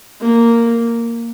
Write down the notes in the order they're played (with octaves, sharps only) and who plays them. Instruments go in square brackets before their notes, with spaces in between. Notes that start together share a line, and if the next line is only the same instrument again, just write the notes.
[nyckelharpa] A#3